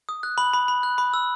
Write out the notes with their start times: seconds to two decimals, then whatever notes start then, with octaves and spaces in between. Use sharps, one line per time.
0.09 D#6
0.23 F#6
0.38 B5 F#7
0.54 B5
0.68 B5
0.83 F#6
0.98 B5
1.14 E6